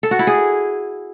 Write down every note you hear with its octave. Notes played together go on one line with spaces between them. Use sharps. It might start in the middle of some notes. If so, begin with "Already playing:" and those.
A4
F#4
E4
G#4